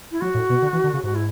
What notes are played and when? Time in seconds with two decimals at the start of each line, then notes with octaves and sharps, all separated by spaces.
0.12 E4
0.21 F#3 F#4
0.35 A2
0.50 B2
0.62 D3
0.73 E3
0.84 D3
0.93 C#3
1.04 G#2 F#4
1.15 E4